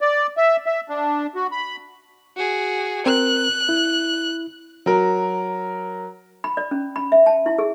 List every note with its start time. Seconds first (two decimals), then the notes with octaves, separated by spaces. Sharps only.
0.01 D5
0.37 E5
0.66 E5
0.89 D4
1.35 F#4
1.52 B5
2.36 F#4 G#4
3.06 C4 A#4 F#6
3.69 E4
4.86 F#3 A#4
6.44 B5
6.57 D5
6.71 C#4
6.96 B5
7.12 E5
7.26 A5
7.46 E4
7.59 G#4